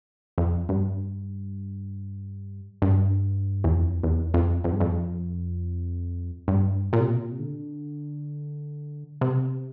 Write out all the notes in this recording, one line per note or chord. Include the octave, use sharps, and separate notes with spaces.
F2
G2
G2
E2
F2
E2
F2
F2
G2
F2
G2
A#2
C3
A#2
C3
D3
C3